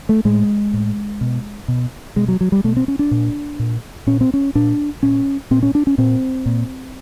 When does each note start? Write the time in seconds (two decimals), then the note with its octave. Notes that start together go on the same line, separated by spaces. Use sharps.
0.09 A3
0.25 A2 G#3
0.73 A2
1.21 B2
1.68 B2
2.16 B2 G#3
2.28 F#3
2.41 F#3
2.52 G3
2.64 B2 A3
2.76 C4
2.88 C#4
2.99 D4
3.11 A#2
3.59 A#2
4.07 A#2 C#4
4.21 C4
4.34 C#4
4.55 A#2 D4
5.03 A#2 C#4
5.51 A#2 C4
5.63 C#4
5.75 D4
5.87 C#4
5.98 A#2 C4
6.46 A#2